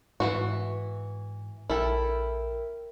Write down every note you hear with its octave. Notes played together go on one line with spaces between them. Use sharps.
G#2 E3 F3 F#4
A#1 E4 A4 A#4 E5 G5